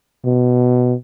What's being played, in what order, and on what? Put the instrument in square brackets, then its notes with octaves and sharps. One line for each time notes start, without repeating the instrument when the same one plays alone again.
[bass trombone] B2